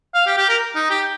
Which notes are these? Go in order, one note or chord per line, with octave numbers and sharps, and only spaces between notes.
F5
G4
G4
A#4
D#4
G4